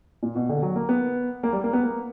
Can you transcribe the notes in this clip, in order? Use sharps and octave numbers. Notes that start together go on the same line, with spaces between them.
A#2
B2
D3
F#3
A#3
B3
A#3
G3
A#3
B3
A#3